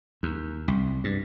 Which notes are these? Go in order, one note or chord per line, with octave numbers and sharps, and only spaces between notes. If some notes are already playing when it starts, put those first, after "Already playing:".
D#2
C2
G2